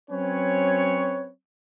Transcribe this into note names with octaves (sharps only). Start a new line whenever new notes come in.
F#3 C4 C#4 B4 C#5